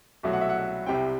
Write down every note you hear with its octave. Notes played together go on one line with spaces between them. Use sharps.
C2 B2 F#3 A3 E5
F#5
E5
F#5
E5
C2 C3 G3 C4 G5